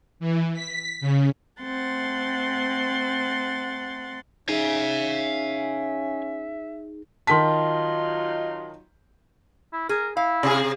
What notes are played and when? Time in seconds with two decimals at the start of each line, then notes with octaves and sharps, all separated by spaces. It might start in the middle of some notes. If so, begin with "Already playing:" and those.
0.20 E3
0.54 B6
1.01 C#3
1.61 A3 C4 F#5 C6 A6
4.49 C#4 D#4 G#4 E5 F5 G#5
7.27 D#3 F#3 D#4 F4 A5 C6 B6
9.73 E4
9.89 G#4 A#4
10.17 E4 F5
10.43 C3 G#4